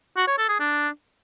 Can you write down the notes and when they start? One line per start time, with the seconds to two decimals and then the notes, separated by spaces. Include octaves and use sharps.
0.17 F#4
0.27 C#5
0.38 A4
0.49 G#4
0.60 D4